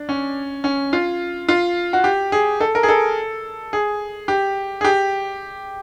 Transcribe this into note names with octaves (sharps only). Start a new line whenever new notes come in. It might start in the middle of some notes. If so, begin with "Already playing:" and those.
Already playing: D4
C#4
C#4
F4
F4
F#4
G4
G#4
A4
A#4
G#4
A4
G#4
G4
G#4
G4